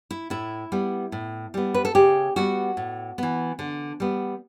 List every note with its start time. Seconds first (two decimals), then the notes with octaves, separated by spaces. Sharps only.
0.11 E4
0.30 A2 E4
0.72 G3 B3
1.12 A2
1.54 G3 B3
1.74 B4
1.85 A4
1.95 C#3 G4
2.36 G3 B3 F#4
2.77 A2
3.18 E3 B3
3.59 D3
4.00 G3 B3